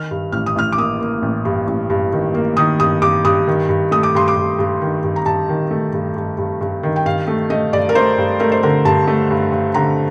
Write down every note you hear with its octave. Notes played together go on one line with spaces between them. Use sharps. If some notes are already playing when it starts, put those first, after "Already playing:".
Already playing: D#3 F6
G2
A1 F6
D#6
A1 F6
D6
A#3 D#6
A#3
A1
G2
A1
G2
D#3
A#3
D#3 D#6
G2 D#6
G2 D6
G2 D#6
D#3
G2
A3 D#6
D6
G2 C6
D6
G2
G2
D#3
G2
A#5
G2 A5
D#3
A3
G2
G2
G2
G2
D#3
G5
G2 F5
A3
A3 D#5
G2 D5
A#4
A3 C5
G2
A3 A#4
C5
D3 A#4
G2 A5
A3
G2
G2
D3 A#5